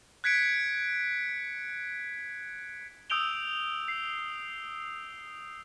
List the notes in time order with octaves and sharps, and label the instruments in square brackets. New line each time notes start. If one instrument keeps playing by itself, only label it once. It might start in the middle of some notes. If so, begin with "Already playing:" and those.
[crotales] F#6 G#6 B6 C#7 D7
D#6 E6 G6 D7 F7 G7
C7